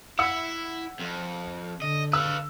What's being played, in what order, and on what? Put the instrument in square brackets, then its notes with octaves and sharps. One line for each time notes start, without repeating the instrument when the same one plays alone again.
[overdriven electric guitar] E4 B5 [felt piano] F#5 E6 C#7
[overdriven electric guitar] F2
[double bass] D3 [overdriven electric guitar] D#5
[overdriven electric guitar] B4 F5 [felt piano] E6